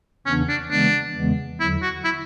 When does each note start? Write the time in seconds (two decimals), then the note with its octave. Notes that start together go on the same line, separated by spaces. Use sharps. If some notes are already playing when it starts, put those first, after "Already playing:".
0.26 E2 C#3 E3 B3 C#4 D4
0.49 D4
0.71 C#3 E3 G#3 B3 D4
1.16 E2 C#3 E3 G#3 B3
1.60 E2 D3 F#3 E4
1.82 F#4
2.04 E4